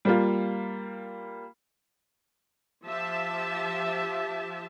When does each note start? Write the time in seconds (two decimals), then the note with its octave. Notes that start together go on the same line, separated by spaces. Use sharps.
0.05 G3 A#3 F4
2.86 F3 G4 E5 A5